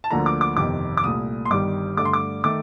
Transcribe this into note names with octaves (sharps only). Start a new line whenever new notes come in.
A5
D2 D3 F3 A#3 A#5
D6
D6
G1 F2 C3 D#3 D6
D6
C2 A#2 A3 D#6
C6
G1 G2 D#3 G3 D6
G2 D3 A3 D6
C6
D6
D#3 A3 D6